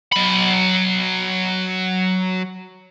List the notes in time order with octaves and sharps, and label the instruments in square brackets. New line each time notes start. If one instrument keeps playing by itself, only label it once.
[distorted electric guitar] F#3 B5